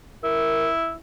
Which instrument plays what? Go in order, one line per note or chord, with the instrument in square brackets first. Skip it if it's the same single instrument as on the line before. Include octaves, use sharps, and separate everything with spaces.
[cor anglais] E4 [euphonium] A#4